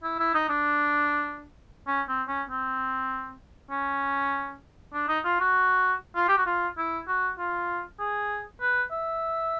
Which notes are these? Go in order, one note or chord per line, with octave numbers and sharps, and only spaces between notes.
E4
E4
D#4
D4
C#4
C4
C#4
C4
C#4
D4
D#4
F4
F#4
F4
G4
F#4
F4
E4
F#4
F4
G#4
B4
E5